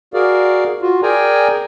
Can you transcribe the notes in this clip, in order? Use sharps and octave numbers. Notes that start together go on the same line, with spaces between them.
F#4 G#4 A#4 D5 F5
F4 F#4
G#4 A#4 D5 G5 G#5 A#5